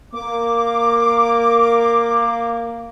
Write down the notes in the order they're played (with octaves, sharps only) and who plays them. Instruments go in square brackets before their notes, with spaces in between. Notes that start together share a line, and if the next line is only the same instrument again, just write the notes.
[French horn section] A#3 [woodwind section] D6